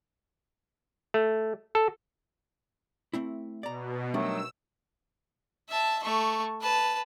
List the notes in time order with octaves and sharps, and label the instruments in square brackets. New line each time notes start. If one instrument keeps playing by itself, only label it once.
[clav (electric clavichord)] A3
A4
[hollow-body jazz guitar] A3 C4 E4
[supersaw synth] B2 [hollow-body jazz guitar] D5 A#5
[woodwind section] D#3 F#3 A3 [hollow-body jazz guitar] G3 D4 [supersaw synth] E6
[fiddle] E5 A5
A3 C#6
B4 A5